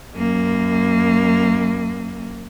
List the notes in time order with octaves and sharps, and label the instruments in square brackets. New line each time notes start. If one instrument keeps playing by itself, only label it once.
[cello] F#2 A#3